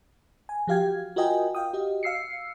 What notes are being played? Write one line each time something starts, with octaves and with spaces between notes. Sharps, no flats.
G#5
F3 F#4 G4 F5 G5 G#6
F4 F#4 A#4 D#5 G5 G#5
F5 G5 D#6
F#4 G4 D#5
F5 E6 C7 C#7